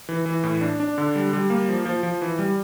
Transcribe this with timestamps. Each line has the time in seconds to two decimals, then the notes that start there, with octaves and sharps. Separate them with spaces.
0.09 E3
0.26 E3
0.44 A2
0.61 D4
0.80 D4
0.98 D3
1.15 G3
1.33 G3
1.50 A#3
1.69 F3
1.85 F3
2.03 F3
2.22 E3
2.39 G3